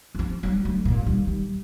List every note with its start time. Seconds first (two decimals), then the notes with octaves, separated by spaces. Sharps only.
0.15 F3 C4
0.43 F#3 G3
0.65 D3 A3
0.85 G1 A#2
1.06 D#2 G3
1.27 G3